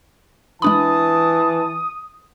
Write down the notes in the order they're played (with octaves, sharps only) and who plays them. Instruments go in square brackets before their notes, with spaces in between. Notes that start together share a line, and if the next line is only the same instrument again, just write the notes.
[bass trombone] E3 [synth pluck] G#3 D4 B5 [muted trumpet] A5 [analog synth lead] D#6